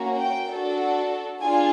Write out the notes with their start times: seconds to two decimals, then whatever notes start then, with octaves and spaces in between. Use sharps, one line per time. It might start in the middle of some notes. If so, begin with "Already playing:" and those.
Already playing: A#3 C#4 F#4
0.18 G5
0.48 D4 F#4 A4
1.41 D4 F4 G#4 G#5